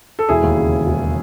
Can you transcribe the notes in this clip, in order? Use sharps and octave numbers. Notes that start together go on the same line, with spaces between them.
A4
E1 E4 G#4
D#2
C#3
E3
E1